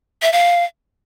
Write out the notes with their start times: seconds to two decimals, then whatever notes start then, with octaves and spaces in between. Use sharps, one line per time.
0.22 E5
0.32 F5